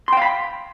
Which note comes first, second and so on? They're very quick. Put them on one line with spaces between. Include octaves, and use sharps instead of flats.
C6 G5 F5 B5